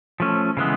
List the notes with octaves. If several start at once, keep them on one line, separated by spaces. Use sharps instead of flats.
F3 A3 C#4
C#3 E3 G#3 B3